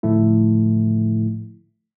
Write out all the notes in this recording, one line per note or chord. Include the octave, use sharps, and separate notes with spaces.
A2 D3 F3 A3 E4